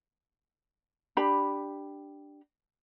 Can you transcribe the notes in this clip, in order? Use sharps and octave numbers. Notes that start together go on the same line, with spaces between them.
D4 G4 B5